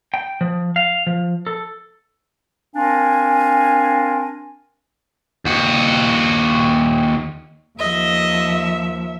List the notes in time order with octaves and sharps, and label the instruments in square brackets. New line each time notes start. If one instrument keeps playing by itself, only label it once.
[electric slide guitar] G5
F3
F5
F3
A4
[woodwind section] C4 D4 A#4 F5 G#5
[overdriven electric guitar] D#2 F#4
[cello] D#2 F3 [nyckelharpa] D#5 [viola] E5